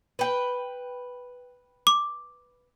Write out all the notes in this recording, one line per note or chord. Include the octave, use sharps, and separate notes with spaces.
B4 G5
D6